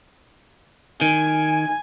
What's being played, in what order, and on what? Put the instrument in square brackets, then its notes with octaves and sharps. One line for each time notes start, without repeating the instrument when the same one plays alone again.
[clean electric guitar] D#3 [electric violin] G#5